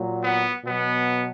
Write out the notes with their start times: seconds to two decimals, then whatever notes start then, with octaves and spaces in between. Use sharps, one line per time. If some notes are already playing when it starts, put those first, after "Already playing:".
Already playing: A#2 F#3
0.23 B3
0.64 B2 F#3 B3